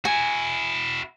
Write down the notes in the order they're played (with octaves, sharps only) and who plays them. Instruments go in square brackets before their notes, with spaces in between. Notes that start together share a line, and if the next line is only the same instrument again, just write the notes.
[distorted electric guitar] E4 F#4 [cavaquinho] G#5